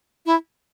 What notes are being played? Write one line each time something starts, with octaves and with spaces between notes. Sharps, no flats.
E4